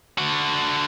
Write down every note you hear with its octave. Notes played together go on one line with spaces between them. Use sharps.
D3 F#4